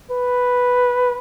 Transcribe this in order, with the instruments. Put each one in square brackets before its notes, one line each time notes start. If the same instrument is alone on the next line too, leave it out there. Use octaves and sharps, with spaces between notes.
[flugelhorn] B4